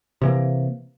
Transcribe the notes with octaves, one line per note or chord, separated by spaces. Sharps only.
C3 E3 A#3